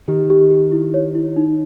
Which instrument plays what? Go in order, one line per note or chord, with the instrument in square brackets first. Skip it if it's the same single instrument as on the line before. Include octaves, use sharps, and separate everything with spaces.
[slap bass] D#3 [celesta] G4
[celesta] G4
G4
E4
C#5
E4
D#4